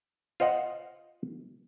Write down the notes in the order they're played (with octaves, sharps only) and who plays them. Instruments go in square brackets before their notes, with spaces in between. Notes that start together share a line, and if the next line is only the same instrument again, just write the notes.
[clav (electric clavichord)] F4 C5 D#5 F#5